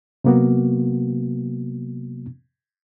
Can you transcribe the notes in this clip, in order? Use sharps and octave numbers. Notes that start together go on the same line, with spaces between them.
C3 F#3 A#3 B3 F#4